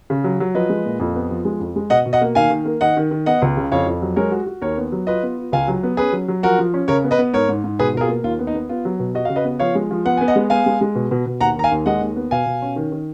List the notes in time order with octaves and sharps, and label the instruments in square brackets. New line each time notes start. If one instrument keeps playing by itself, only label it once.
[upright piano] C#3
F#3
F#3
[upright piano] F3 [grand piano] B4 D#5
[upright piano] G#3
A#2
F2
B3
F3
G#3
F2
G#3
[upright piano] B2 [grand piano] D#5 F#5
[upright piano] B2
[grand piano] D#5 F#5
[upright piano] A#3
[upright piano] D#3 [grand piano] F5 G#5
[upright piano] D#3
A#3
[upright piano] D#3 [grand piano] D#5 F#5
[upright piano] D#3
D#3
[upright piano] B3 [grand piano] D#5 F#5
[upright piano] C#2
C#3
[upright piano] F2 [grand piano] C#5 F5
[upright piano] F2
F#3
[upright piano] G#3 [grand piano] A#4 C#5
[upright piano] F#4
F#4
[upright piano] D#2 [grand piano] A#4 C#5
[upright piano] B3
F#3
[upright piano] F4 [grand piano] B4 D#5
[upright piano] B3
F4
[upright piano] C#2 [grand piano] F5 G#5
[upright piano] F#3
B3
[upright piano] C#4 [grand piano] G#4 B4
[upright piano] F#3
F#3
[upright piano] F3 [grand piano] F#4 A#4
[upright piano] F3
C#4
[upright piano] C#3 [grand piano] A#4 C#5
[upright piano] B3
[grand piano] B4 D#5
[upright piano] B3
[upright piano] G#2 [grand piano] A#4 C#5
[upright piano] G#2
G#2
[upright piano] B2 [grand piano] G#4 B4
[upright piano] B2 [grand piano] A#4
[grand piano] F4 G#4
[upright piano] A#3
[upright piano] D#2 [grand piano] F4
[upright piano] B3
[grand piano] D#4
[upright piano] B3
[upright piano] B3 [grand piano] F4
[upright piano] F#3
B2
[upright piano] F#4 [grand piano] D#5
[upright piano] C#3 [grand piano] F5
[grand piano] B4 D#5
[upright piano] B3
[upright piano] F3 [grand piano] C#5 F5
[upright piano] G#3
F3
[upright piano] B3 [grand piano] F#5
[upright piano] B3 [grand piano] G#5
[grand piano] D#5 F#5
[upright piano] G#3
[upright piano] B3 [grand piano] F5 G#5
[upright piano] G#3
G#3
B2
B2
B2
[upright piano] D#2 [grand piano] F#5 A#5
[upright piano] D#3 [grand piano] A#5
[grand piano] F5 G#5
[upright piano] D#2
[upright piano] G#3 [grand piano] D#5 F#5
[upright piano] D#2
B3
[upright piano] B2 [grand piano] F5 G#5
[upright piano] B2
C#4
D#3
D#3